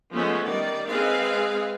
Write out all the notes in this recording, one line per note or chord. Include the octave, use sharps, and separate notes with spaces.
F3 G#3 A3 B3 C#4 C5
D#3 G3 D5
G#3 C4 G#4 B4 F5